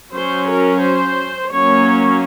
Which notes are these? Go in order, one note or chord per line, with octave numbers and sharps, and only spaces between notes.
F#3 C#4 C5
A#4
C5
F#3 A#3 C#4 C#5